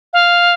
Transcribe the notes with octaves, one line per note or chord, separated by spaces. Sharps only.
F5